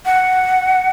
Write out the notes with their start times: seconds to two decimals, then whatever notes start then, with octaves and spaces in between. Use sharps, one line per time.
0.06 F#5